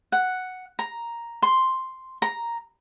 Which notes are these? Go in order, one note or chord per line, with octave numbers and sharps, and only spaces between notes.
F#5
A#5
C6
A#5